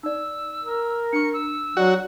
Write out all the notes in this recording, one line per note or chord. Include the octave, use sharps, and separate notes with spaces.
D#4 D5 E6
A#4
D4 C#6 C#7
E6
F#3 F#4 D5 G5